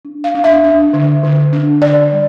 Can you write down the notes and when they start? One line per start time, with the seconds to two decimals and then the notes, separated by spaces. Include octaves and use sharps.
0.05 D4
0.24 F5
0.34 D4
0.44 E5
0.64 D4
0.93 D3
1.23 D3
1.53 D4
1.82 D3 D5
2.12 G3